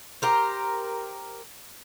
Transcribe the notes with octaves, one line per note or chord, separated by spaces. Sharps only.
G4 A#4 C5